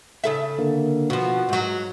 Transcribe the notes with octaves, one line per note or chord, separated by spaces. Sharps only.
C#3 A4 E5
D3 A#3
B2 F3 F#4
G#2 F#3